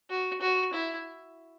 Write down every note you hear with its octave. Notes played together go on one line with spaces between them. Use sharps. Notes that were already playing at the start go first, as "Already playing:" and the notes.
F#4
F#4
E4